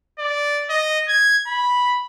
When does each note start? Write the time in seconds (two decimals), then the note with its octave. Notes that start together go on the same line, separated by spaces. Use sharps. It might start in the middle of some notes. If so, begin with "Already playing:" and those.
0.19 D5
0.70 D#5
1.08 G#6
1.47 B5